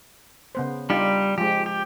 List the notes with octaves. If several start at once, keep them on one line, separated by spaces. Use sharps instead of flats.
C#3 B3 C5
G3 D4 D#4 F4 G4
F3 G#3 G4
G4